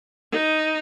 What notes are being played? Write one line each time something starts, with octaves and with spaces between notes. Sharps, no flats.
D#4